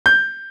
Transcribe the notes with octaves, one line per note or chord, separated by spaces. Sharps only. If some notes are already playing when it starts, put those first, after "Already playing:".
G6